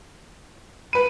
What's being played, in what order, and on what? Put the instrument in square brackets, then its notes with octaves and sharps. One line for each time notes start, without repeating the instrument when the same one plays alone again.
[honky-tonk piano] B4 D#7 [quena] B5